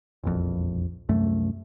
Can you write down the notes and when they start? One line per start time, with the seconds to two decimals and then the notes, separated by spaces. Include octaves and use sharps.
0.23 E1 A#1 F2
1.09 C2 F#2 A3